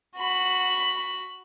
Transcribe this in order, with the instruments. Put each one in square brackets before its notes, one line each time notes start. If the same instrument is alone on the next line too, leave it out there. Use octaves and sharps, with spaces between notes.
[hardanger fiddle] F#4 B5